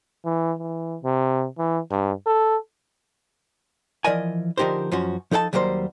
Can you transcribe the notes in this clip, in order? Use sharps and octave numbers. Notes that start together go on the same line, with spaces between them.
E3
E3
C3
E3
G2
A4
E3 F3 A#4 D5 D#5 G#5
D3 F3 D#4 G4 A#4 C5
F#2 F3 C#4 F#4
F3 D#4 A4 F#5 A5
D#2 F#3 G3 A#3 C5